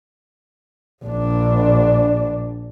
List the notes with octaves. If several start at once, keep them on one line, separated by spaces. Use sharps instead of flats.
A#1 D4